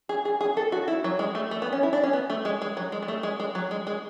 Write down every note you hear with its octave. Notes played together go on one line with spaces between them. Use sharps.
G#4
G#4
G#4
A4
F#4
E4
F#3
G#3
A3
A3
B3
C#4
E4
D4
C#4
B3
A3
G#3
G#3
F#3
G#3
G#3
A3
G#3
G#3
F#3
G#3
G#3